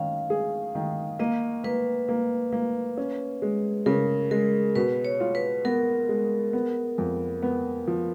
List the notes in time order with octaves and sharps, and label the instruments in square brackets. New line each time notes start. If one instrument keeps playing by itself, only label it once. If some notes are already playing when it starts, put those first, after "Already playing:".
Already playing: [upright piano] D#3 C#4 [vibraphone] F5
[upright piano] G#4
D#3
[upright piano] A#3 [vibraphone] D#5
[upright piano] A#3 [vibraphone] B4
[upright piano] A#3
A#3
C#4
G#3
[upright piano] C#3 [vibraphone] A#4
[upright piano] G#3 [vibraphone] A#4
[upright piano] B2 [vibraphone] B4
[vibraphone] C#5
[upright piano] F4
[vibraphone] B4
[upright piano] B3 [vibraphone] A#4
[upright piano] G#3
B3
F2
B3
F3